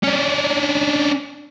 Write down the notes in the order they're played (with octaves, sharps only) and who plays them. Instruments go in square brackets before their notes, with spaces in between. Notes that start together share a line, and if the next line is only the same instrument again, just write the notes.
[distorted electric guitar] C#4 D4